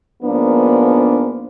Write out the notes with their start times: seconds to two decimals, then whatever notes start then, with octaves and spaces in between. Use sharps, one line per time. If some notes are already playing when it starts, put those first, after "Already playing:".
0.23 G#2 F3 A#3 B3 D4